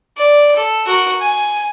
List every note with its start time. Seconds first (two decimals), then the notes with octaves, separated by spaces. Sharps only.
0.17 D5
0.56 A4
0.86 F#4 A#4
1.21 G#5